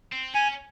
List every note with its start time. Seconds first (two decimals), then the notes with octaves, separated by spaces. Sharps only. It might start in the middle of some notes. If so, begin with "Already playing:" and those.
0.12 C4
0.34 C#4 G#5